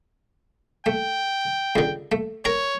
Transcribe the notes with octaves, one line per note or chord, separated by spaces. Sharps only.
A3 G5
C#2 D3
A3
A#4 C#5 A#5